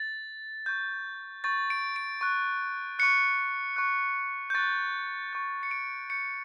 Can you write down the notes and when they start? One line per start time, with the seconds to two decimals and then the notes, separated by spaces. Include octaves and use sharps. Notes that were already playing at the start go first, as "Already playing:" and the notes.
Already playing: A6
0.66 C#6 G6
1.44 C#6 G6 A6
1.70 D7
1.96 D7
2.21 C#6 F#6
2.99 C#6 F#6 C#7
3.76 C#6 F#6
4.50 G6
4.54 C#6 F#6 A6
5.33 C#6 G6
5.63 C#7
5.71 D7
6.10 C#6 G6 C#7